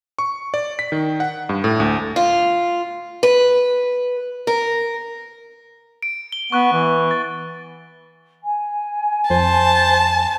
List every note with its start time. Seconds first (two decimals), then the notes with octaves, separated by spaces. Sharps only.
0.19 C#6
0.54 D5
0.79 B6
0.92 D#3
1.20 F#5
1.49 G2
1.64 A2
1.80 D2
2.16 F4
3.23 B4
4.47 A#4
6.03 D7
6.32 G7
6.52 B3 C#6 F#6
6.73 E3
7.11 A6
8.43 G#5
9.30 F2 C5 A5